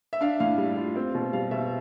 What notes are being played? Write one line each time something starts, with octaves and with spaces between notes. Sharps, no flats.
E5
D4 F5
A2 F5
G3
F4
C4
B2
G3 F5
B2 E5